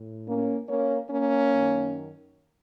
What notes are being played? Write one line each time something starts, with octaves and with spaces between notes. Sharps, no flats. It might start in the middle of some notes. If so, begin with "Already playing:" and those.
Already playing: A2
A#3 C#4
A#3 C#4
A#3 C#4
F#2 D#3